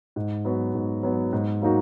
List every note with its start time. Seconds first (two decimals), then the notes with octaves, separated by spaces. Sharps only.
0.16 G#2
0.45 F#3 B3 F#4
0.74 G#2
1.03 F#3 B3 F#4
1.33 G#2
1.62 F#3 A#3 D#4 F#4